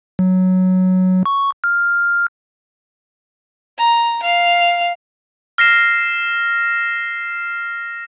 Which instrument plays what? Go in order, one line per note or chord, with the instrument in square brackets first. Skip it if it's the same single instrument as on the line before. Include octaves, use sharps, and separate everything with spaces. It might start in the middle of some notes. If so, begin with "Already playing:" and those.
[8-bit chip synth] F#3
C#6
F6
[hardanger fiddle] A#5
F5
[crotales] F6 A#6 C7 E7